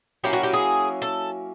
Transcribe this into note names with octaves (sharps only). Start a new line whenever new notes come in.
F#3 A#3 C#4 E4 G4
F#4
G4
G#4
A4